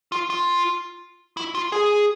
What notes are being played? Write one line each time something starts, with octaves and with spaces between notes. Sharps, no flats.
F4
F4
E4
F4
G#4